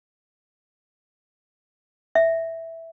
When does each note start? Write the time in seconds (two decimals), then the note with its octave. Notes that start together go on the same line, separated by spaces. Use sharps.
2.15 E5